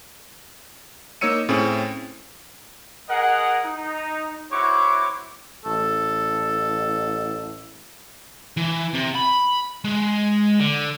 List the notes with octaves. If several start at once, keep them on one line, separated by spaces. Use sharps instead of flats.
A#3 D#4 C#5 E6 C#7 D#7
A2 C4 C#4 G#4
G#4 A#4 D#5 F#5
D#4
E4 F#4 C5 C#5 C#6 D6
A1 A4
E3
C3
B5
G#3
D3